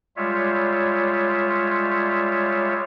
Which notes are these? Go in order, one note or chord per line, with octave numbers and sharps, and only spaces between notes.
G3 G#3 F4 C#5 E5